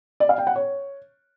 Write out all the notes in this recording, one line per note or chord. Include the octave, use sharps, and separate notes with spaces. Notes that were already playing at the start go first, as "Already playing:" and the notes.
D5
F5
G5
F#5
C#5